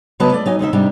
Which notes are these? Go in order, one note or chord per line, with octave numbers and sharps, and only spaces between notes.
C#3 F#3 B3 B4 D#5 A5
A3 D5
F#3 D#4 G#5
D#2 C#3 D#4 E5
G#2 C3 G3 D4